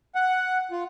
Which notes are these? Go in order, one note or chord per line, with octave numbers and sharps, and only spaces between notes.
F#5
F4